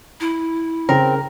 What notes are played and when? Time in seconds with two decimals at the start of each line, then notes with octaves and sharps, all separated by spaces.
0.20 E4
0.89 C#3 C4 A#4